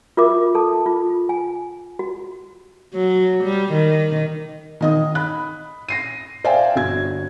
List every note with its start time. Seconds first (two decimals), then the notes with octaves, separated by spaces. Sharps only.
0.17 F4 F#4 A#4 E5 D6
0.55 A4 A5
0.86 F4
1.29 G#5
1.99 F#4
2.94 F#3
3.44 G3
3.73 D#3
4.81 D#3 D#5 D#6
5.15 B5 F#6
5.89 A#6 C7 D#7
6.44 C5 D5 E5 F5 G5 G#5
6.76 G1 F#4 G#6